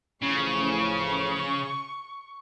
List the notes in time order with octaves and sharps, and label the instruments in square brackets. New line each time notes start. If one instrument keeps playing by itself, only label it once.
[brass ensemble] A1 E3 F3 [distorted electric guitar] C#3 [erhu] C#6